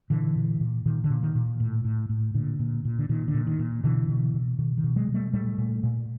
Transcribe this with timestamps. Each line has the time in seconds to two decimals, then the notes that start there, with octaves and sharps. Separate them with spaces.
0.10 A#2 D3 E3
0.36 A#2
0.60 A#2
0.86 A#2 D#3
1.04 D3
1.10 A#2
1.23 D#3
1.35 A#2
1.60 A2
1.85 A2
2.09 A2
2.34 A#2 D3
2.59 A#2
2.85 A#2
2.99 D3
3.09 A#2 D#3
3.28 D3
3.34 A#2
3.47 D#3
3.59 A#2
3.84 B2 D3 E3
4.09 B2
4.34 B2
4.58 B2 D#3
4.78 D#3
4.84 B2
4.96 F#3 G#3
5.08 B2
5.14 G3 A3
5.33 A#2 G3 A3
5.58 A#2
5.83 A#2